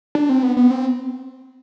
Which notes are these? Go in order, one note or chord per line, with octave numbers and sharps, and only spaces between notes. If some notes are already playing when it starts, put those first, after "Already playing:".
D4
C4
B3
B3
C4